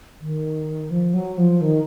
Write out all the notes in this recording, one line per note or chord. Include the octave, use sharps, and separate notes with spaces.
D#3
F3
F#3
F3
D#3